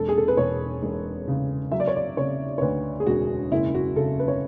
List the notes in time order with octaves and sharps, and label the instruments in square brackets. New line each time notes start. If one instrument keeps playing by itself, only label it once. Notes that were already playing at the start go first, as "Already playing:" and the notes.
Already playing: [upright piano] E1 A4
G#4
A4
B4
E1 C#5
E1
C#3
F#3 E5
D5
C#5
D5
C#3 C#5
C#5
D2 B4
G#4
E1 F#4
F#1 E4
F#4
C#3 A4
B4
C#5